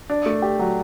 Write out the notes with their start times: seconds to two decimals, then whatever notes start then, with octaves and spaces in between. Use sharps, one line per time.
0.10 D4
0.26 A3
0.42 G4
0.59 F#3